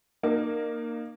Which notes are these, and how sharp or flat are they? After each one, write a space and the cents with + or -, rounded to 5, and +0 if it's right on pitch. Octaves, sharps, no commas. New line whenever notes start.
A#3 +0 D#4 -35